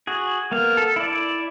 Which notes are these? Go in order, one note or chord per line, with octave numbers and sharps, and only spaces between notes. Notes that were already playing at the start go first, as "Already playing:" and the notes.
F#4 G#4
A#3 B3 F5
A4
E4 D5